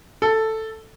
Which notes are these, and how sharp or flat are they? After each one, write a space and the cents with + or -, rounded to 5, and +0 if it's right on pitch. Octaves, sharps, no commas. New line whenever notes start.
A4 +5